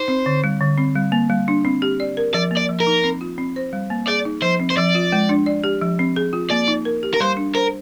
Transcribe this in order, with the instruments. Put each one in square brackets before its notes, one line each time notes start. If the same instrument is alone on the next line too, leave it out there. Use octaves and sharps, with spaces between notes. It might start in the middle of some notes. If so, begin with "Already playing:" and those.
Already playing: [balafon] D#4 [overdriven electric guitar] C5
[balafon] C4
D3
G3
D3
C4
G3
A#3
G3
D4
C4
G4
D5
A#4
[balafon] F3 [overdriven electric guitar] D5
[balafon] A#3
[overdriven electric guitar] D5
[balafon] F3
[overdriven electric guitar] A#4
[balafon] D#4
C4
F4
C4
C5
G3
A#3
[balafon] G#4 [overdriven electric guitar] D5
[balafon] D#4
[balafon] F3 [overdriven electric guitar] C5
[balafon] C4
[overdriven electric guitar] C5
[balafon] F3 [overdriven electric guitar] D5
[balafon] F4
G#3
D4
D5
G4
F3
C4
G#4
F4
[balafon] A#3 [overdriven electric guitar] D5
[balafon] D#4
A#4
G4
[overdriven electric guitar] A#4
[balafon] G3 [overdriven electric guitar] C5
[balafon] D4
[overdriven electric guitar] A#4 [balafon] C5